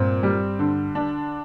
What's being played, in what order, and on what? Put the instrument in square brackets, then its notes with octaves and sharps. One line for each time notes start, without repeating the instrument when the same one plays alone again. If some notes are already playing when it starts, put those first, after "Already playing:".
Already playing: [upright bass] G2 [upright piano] A#2 C4
[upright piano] G3
D3
D4